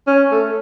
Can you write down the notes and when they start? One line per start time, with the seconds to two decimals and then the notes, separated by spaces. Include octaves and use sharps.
0.07 C#4
0.31 A3